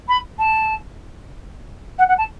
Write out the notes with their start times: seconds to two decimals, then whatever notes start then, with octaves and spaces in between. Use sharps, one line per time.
0.08 B5
0.38 A5
1.98 F#5
2.08 F#5
2.17 A5